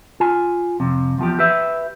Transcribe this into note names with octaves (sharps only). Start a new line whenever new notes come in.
F4 G#5
F2 C3
E2 F3 G4
G4 B4 E5